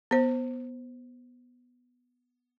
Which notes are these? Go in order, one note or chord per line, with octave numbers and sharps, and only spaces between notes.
B3 C5